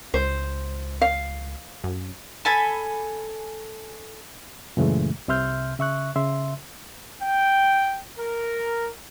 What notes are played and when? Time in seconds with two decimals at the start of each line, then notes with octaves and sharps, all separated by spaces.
0.14 C#2 C5
1.01 F5
1.84 F#2
2.45 A4 G#5 B5
4.77 F#2 A#2 C#3 E3 G#3 A3
5.28 C2 C3 E5 C6 F6 G6
5.79 C#3 E5 C#6 F#6
6.15 C#3 E5 C6
7.22 G5
8.19 A#4